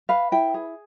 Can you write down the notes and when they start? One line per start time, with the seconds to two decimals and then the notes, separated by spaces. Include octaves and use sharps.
0.09 B4 F5
0.32 E4 G5
0.54 G#4